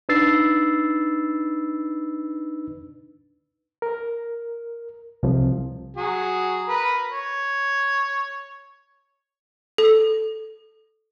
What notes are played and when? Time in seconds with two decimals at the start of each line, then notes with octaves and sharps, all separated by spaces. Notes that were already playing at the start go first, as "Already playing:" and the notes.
0.09 D4 D#4 B4 E6 A6 C7
3.82 A#4
5.23 C2 C3 F3
5.97 F#3 F#4 G#4
6.68 A#4 B4
7.10 C#5
9.78 A4